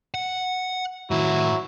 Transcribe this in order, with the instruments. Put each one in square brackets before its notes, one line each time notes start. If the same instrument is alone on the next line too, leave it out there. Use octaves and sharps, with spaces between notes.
[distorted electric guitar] F#5
[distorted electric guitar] A2 D#3 [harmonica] F#3 E4